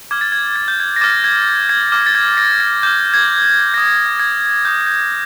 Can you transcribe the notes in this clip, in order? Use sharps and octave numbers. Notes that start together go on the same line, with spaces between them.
D6 F6 G#6
A6
G#6
G#6
G6
G#6
A#6
D6 F6 A6
G#6
G#6
D6 F6
A6
G#6
A#6
A6
D6 F6 G6
G#6
D#6 G6 A#6
G#6
D#6 G6
G6